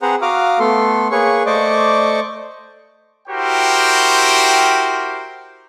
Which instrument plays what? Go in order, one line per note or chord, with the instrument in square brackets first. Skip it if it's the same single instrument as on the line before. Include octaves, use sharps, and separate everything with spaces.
[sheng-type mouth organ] C4 G#4 B4 C5 F#5 A#5
F#4 F5 A#5 D6 D#6 F6
A3 B3 A4 C6
A#3 G#4 B4 C#5 C#6
A3 C5 D5 D#5 C#6 D6
[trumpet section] E4 F#4 G4 A#4 C5 G5